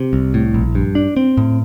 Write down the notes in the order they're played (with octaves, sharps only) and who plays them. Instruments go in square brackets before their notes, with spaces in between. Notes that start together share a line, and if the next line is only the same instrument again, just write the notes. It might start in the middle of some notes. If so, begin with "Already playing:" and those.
Already playing: [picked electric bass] C3
C2
A2
A#1
G2
D4
C4
A2